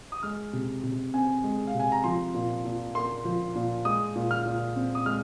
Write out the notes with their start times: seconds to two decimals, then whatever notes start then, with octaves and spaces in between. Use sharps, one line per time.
0.12 D#6
0.23 G#3 F6
0.53 C3
0.83 C3
1.14 C4 G#5
1.44 G#3
1.67 F5
1.74 C3
1.80 G#5
1.92 A#5
2.04 F3 C6
2.34 A#2
2.65 A#2
2.95 A#3 C6
3.25 F3
3.55 A#2
3.85 G#3 D#6
4.15 A#2
4.31 F6
4.46 A#2
4.76 C4
4.95 D#6
5.06 G#3 F6